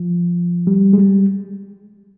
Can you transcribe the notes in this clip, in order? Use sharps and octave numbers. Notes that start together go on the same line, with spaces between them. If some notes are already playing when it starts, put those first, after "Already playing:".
Already playing: F3
G3
G#3
G3